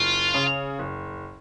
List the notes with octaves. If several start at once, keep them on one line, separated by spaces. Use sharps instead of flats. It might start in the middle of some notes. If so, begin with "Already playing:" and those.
Already playing: F#1 F4
C#3
F#1